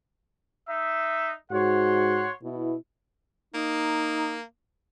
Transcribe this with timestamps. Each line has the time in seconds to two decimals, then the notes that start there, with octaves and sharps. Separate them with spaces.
0.68 D#4 E5
1.52 G#2 F#4 C#5 F#5 C6
2.43 B2 B3 E4
3.54 A#3 D#4